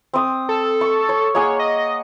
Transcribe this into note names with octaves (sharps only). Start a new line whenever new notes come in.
C4 D#6
A4
C#6
C#5
A#3 G#4 C#5 F#5
D#5